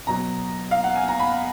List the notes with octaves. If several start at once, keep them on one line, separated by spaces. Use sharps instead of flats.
B2 F#3 A#5
F5
F#5
G#5
A#5
B5